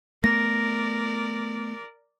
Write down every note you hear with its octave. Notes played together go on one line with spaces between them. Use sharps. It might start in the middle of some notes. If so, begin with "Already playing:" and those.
A3 B3 A#4 D5 A#6